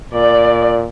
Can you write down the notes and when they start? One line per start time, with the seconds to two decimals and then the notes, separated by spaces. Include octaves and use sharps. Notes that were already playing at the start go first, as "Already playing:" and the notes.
0.14 A#2 D5